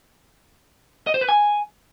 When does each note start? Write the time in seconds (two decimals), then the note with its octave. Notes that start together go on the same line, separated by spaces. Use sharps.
1.07 D#5
1.14 C5
1.21 B4
1.29 G#5